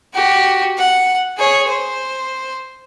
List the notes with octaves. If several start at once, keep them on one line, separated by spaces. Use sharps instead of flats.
F#4 G4
F#5
G#4 C#5
C5